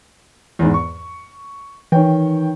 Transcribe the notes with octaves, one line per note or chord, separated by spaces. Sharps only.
E2 G#2
C#6
D#3 E3 C#5 G5